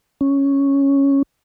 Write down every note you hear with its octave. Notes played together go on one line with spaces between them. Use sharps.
C#4